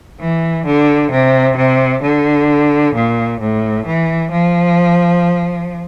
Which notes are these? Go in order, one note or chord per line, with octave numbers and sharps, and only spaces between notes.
E3
D3
C3
C3
D3
A#2
A2
E3
F3